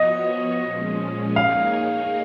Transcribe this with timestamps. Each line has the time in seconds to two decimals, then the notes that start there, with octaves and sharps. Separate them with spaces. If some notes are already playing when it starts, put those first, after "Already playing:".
Already playing: F3 B3 F#4 C#5 D#5
0.63 A#2 F3 G#3 C#4
1.36 A#3 D#4 G#4 C#5 F5